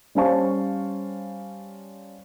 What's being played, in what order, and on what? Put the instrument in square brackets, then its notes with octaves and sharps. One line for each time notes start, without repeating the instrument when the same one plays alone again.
[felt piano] G3 C#4 C5 F5 A5 C#6